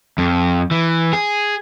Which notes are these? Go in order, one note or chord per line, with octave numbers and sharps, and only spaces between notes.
F2
E3
G#4